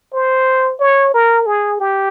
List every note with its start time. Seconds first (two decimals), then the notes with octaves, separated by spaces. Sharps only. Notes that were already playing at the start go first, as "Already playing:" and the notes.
0.14 C5
0.80 C#5
1.14 A#4
1.46 G#4
1.80 G4